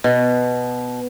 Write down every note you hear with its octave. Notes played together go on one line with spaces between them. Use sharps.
B2